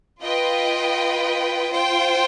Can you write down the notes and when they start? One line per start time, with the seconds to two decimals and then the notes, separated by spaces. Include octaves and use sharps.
0.22 F4 B4 D#5 G5
1.71 F4 C5 G5